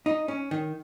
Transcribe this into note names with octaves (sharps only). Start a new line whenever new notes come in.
D#4
C#4
D#3